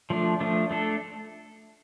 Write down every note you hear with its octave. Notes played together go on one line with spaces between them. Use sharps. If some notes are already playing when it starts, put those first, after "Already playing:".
F3 A3 D4
F3 A3 D4
A3 D4 A4